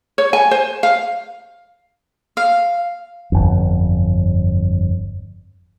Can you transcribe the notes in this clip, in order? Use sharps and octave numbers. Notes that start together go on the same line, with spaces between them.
C#5
G#5
C5
F5
F5
G1 F2